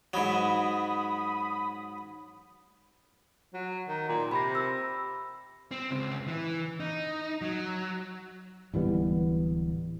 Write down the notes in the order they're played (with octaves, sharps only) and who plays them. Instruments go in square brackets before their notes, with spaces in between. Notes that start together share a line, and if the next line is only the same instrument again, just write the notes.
[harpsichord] G#2 F#3 [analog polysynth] B5 D#6
[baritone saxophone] F#3
D#3
A#2
[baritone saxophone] C3 [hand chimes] B5 A#6
[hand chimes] E6 A#6
[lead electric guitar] C4
C#2
E3
D#4
F#3
[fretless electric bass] D1 E3 G3 B3